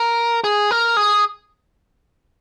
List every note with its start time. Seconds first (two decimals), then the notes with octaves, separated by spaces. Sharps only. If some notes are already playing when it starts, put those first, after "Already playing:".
Already playing: A#4
0.44 G#4
0.71 A#4
0.97 G#4